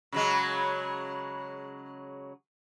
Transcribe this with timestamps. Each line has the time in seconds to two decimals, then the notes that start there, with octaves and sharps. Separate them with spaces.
0.12 C#3 F#3 G#3